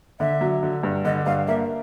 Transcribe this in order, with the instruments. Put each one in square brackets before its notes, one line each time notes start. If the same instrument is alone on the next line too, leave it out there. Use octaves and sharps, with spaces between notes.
[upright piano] D3 [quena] E5
[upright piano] F#3
D3
G2
[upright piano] D3 [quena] D#5
[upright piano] G2 [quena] F5
[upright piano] A#3 [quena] E5